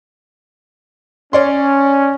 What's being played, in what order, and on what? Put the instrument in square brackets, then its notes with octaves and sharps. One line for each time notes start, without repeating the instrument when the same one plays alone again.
[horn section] C#4 [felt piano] C#5 D5 C6